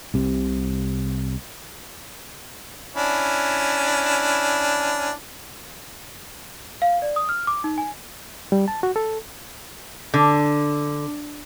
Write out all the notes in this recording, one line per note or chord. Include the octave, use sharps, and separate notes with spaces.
C2 C3
C#4 D4 E4
F5
D5
D#6
F6
D6
D#4
G#5
G3
A5
F#4
A4
D3